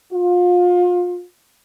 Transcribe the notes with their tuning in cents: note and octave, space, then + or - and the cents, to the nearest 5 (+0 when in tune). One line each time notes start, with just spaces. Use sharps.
F4 +30